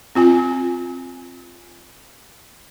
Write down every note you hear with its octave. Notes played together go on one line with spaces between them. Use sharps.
C4 F4 G#5